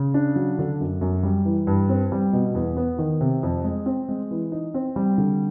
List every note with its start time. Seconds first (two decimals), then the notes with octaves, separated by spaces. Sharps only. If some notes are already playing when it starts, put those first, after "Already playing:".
Already playing: C#3
0.14 D4
0.36 F#3
0.59 D3
0.80 F#2
1.01 F#2
1.23 G3
1.45 E3
1.67 G2
1.89 C4
2.12 G3
2.33 B2
2.54 E2
2.77 B3
2.99 D#3
3.21 C3
3.43 F2
3.64 G#3
3.86 C4
4.09 G#3
4.31 E3
4.52 D#4
4.74 C4
4.96 G3
5.18 D3